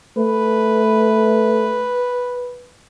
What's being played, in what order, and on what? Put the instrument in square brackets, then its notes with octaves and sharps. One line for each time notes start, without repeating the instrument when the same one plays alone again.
[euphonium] A3 [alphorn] B4